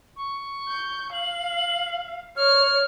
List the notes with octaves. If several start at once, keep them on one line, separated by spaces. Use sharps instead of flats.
C#6
G6
F5 F#7
C#5 F6